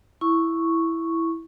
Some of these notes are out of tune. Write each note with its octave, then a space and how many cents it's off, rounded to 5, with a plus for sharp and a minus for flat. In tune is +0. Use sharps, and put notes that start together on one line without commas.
E4 +0 C#6 +0